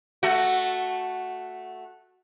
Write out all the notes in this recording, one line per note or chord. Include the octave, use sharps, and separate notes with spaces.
A3 F#4